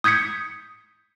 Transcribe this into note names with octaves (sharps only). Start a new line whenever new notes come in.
D#6 G6 G#6 B6 C#7